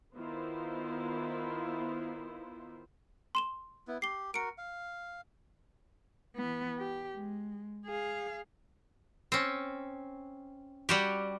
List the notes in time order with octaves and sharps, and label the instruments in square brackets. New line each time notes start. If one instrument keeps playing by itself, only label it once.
[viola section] D#3 B3 E4 F4 C5
[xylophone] C6 E7 G7
[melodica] B3 E4
[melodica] G4 [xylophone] C7 G7
[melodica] F#4 A#4 [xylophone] C#7 D7
[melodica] F5
[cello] E3 B3
G4
G#3
G#4 F5
[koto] C4 C#4
G3 F#4 G4